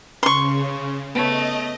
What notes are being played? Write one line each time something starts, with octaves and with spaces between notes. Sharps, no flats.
C#3 C6 C#6
A3 B3 C#5 D#5